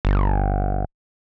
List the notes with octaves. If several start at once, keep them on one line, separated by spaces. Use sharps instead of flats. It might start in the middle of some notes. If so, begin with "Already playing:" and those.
G1